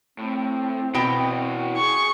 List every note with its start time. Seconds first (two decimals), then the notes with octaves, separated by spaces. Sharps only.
0.18 A2 C4
0.94 B2 E3 F#4 G5
1.77 G#4 C#6